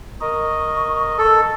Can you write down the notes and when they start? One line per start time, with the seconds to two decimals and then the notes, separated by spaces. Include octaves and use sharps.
0.21 A#4 D#5 C#6
1.18 A4